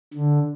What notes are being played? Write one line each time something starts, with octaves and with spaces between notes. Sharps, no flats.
D3